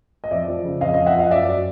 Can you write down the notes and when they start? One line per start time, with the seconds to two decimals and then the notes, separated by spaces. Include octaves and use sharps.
0.24 D#5
0.31 F2 D5 E5
0.48 F3
0.65 C#3
0.81 F2 D#5 F5
0.94 F2 D#5 F5
1.06 E5 F#5
1.14 F3 D#5 F5
1.31 F#2 D5 E5
1.48 F#3